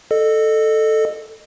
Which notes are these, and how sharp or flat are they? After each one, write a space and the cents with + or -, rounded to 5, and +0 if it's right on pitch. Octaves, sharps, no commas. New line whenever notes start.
A4 +0 D#5 -30